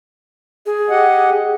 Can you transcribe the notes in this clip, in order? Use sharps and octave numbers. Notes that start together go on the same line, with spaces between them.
G#4
G4 D#5 F#5